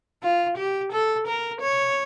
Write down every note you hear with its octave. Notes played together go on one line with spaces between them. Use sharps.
F4
G4
A4
A#4
C#5